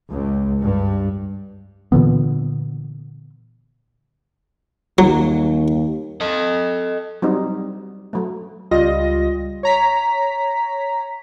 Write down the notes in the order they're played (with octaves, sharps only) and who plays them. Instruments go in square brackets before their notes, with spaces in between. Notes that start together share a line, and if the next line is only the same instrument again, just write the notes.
[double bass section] C#2
G2
[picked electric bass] A#2 D3 E3 B3
[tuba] D#2 [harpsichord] F#3
[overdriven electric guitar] A4 D#5
[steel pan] F#3 G3 C4 D#4
F#3 A3
[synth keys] C#2 G3 F4 D#5 A#6
C#5 A#5 B6